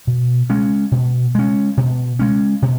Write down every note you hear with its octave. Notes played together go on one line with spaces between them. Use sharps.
B2
G#3 C#4
B2
G#3 C#4
B2
G#3 C#4
B2